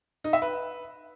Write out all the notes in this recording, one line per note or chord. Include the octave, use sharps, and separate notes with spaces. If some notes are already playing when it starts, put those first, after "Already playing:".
D#4
E5
B4